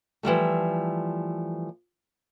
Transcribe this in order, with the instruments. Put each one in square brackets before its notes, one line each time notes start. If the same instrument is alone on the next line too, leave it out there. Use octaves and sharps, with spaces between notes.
[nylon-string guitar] E3 F3 G3 A3